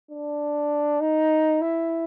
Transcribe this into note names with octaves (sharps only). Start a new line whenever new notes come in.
D4
D#4
E4